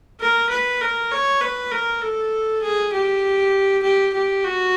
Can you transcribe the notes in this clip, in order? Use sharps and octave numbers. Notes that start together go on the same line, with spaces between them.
A#4
B4
A#4
C#5
B4
A#4
A4
G#4
G4
G4
G4
F#4